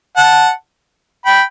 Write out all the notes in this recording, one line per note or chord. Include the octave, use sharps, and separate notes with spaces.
F#5 A5
G5 B5